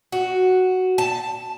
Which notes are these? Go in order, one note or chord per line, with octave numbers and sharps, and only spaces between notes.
F#4
A5